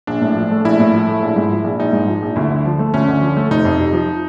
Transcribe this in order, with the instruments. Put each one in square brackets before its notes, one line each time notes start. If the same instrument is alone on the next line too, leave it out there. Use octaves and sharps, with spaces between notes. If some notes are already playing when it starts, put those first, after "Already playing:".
[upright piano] A#1 [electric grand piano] D4
[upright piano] A2
F3
A3
[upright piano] A#1 [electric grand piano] E4
[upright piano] A2
F3
A3
A#1
G#2
F3
A#1
[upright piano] A#1 [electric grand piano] D#4
[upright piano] G#2
F3
A#1
[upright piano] D2 [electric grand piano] E4
[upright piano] D3
F3
A3
[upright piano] D2 [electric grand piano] C#4
[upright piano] D3
F3
A3
[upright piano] F1 [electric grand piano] D#4
[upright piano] F2
C3
F3